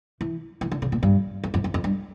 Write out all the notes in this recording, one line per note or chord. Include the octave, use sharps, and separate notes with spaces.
E3
E3
D3
C#3
A#2
G2
F2
F2
F2
F2
G2